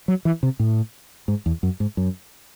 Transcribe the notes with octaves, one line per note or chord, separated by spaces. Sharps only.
F#3
E3
C3
A2
G#2
E2
F#2
G#2
F#2